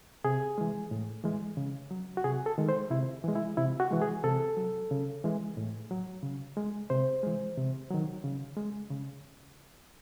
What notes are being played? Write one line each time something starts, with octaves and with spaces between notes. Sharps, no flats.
C3 G#4
E3 G#3
A2
E3 G#3
C#3
F#3
F#4
C3 G#4
A4
D#3 G#3
C5
C3 E4
E3 G#3
E4
C3 E4
F#4
E3 G#3
G#4
C3 A4
F#3
C#3
E3 G#3
A2
F#3
C#3
G#3
C3 C5
E3 G#3
C3
D#3 F#3
C#3
G#3
C#3